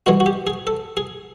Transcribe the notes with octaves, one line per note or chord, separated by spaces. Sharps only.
G2 E3 G#3 F#4
F#4
G4
G#4
A4
G#4